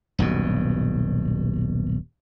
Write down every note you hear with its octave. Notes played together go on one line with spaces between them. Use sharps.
D#1 B1 G2 B2